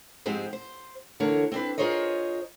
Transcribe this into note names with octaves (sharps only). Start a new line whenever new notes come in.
F2 G#2 G#3 C4 G4 G#4
C5
D3 E3 A3 A#4 C#5
C4 D4 B4
F4 G#4 A#4 C5 C#5 D#5